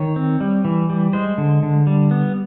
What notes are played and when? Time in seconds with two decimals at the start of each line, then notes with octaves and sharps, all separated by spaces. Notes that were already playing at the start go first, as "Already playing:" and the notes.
Already playing: D#3 C#5
0.16 C4
0.40 G3
0.65 E3
0.90 G3
1.13 G#3 C5
1.38 D3
1.63 D3
1.87 G3
2.11 B3